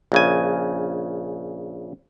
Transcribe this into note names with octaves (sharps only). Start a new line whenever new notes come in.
A#1 C#3 G#5